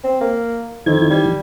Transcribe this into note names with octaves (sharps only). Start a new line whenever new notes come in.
C4
A#3
F2 D#3 E3 G#6
G3